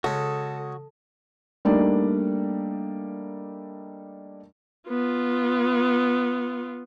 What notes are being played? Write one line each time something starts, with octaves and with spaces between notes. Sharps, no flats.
C#3 G#3 F#4 A4
G3 A3 A#3 D4 D#4 D5
B3 F4